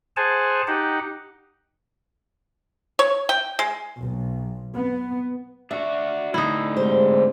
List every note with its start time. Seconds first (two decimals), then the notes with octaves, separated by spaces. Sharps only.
0.17 G#4 C5 F#5 G#5 A5
0.67 D#4 G4 F#5
2.99 C#5
3.29 G5
3.59 G#3
4.00 B1
4.77 B3
5.71 D4 F#4 E5
6.34 A2 D3 D#4 E4
6.77 G#2 C3 G#3 C5